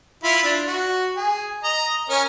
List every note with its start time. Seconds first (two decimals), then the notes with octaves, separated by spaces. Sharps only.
0.24 E4 F4 B5
0.43 D4
0.67 F#4
1.17 G#4
1.64 D#5 A#5
2.10 C#4 A#4 C#5